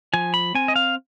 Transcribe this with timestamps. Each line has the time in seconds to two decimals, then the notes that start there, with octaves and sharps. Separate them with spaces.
0.13 F3 G#5
0.34 B5
0.54 C4 G#5
0.68 D#5
0.76 F5